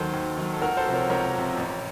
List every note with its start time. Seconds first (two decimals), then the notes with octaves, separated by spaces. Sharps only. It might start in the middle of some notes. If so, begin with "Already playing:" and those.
Already playing: D#2 D#3 F#3 A4 C5
0.13 D#2
0.37 D#3 F#3
0.53 A4
0.61 C#2 F#4 A#4
0.77 A4 C5
0.86 C3 F3
0.93 A#4 C#5
1.09 C#2 A#4 C#5
1.34 C3 F3
1.58 A1